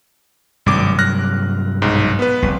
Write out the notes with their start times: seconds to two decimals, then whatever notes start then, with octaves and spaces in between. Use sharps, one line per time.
0.66 G#1 G2 C3 F#3 D6
0.99 F6 F#6 A#6
1.82 B1 G#2
2.19 B3 B4
2.42 F1 C2